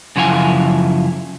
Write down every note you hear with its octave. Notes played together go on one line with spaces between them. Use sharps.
F#2 C#3 F3 E4 F5 G#5